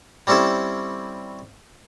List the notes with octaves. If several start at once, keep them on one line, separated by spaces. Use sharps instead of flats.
G3 C4 C#4 E4 A4